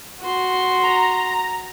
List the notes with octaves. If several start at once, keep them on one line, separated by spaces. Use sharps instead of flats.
F#4 C6
A#5